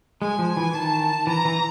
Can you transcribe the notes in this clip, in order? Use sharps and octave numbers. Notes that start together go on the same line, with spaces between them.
G#3 G#5
F3
E3
D#3 A5
E3 A#5
E3